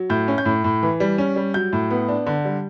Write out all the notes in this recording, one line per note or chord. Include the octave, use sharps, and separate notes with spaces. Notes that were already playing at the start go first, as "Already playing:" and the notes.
Already playing: F#3
A2 G6
C#4
G6
A2
A2
E3
G3
C#4
G3
F#3 G6
A2
B3
D4
D3
G3